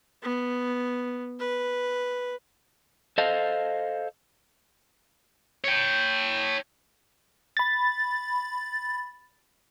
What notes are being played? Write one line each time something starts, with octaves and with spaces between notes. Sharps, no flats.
B3
B4
A4 C5 D#5 F5
C#5 G5
B5 A6